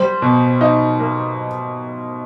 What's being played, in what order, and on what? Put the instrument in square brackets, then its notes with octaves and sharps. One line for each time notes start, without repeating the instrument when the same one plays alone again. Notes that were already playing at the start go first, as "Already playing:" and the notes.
Already playing: [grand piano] G3 [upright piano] C5
[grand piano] B2
D#4
A#3